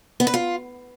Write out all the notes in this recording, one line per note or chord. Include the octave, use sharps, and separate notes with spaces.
B3
B4
F4